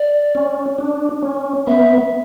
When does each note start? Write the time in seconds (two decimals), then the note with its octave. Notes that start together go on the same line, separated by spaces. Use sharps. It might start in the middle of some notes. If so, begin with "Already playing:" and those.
Already playing: D5
0.35 C#4
0.78 D4
1.22 C#4
1.67 B3 E5